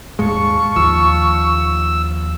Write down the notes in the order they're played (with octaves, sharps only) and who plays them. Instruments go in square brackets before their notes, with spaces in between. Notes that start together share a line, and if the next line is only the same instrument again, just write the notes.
[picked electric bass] D#1 G#2 G#3 [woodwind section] F5 A5 C#6
[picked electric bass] D#2 F3 [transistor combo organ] E6